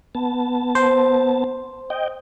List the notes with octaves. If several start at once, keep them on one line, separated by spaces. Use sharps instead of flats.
B3 A5
C5
D#5 G5